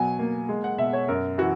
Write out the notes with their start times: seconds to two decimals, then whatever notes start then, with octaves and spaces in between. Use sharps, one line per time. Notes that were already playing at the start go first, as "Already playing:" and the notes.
Already playing: B2 F#3 G#5
0.19 A#3
0.49 G#3
0.64 F#5
0.78 B2 E5
0.93 C#5
1.08 F#2 A#4
1.38 E3 F#4